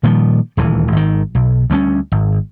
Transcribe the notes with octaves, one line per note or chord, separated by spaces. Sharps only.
A#2 D#3 F3 G3
D#1 D2 E3
G#1 D#3
B1
D2 G3 A3 C#4
G#1